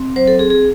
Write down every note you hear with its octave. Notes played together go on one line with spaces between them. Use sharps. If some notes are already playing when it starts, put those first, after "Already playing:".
Already playing: C4
F#3 C5
A4
C4 G#4
G#4